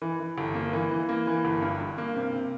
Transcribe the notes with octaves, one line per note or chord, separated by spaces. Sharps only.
E3
E3
G1
A#3
E3
E3
A#3
E3
G1
G2
G2
A#3
C3
C3